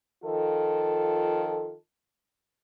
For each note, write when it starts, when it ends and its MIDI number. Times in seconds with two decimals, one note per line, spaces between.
0.24 1.73 51
0.24 1.73 53
0.24 1.73 65
0.24 1.73 69